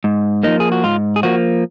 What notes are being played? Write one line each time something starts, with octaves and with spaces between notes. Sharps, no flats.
G#2
F3 A#3 D#4
G#4
F#4
G#2 F4
G#4
F3 A#3 F#4